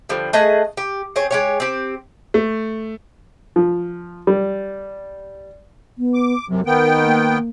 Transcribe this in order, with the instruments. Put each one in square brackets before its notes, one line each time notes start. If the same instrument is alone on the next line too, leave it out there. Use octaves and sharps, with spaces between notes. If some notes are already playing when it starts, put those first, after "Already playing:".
[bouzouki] D3 F3 G3
A3 G#4 D#5 F#5
G4
C4 G#4 C#5
G#3 G4 C#5
C4 G4
[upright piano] A3
[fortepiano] F3
G3
[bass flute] B3
[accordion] D6
[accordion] F#2 C3 [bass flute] F#3
[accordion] D#3 B3 G5 [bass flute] A#4
[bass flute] A#3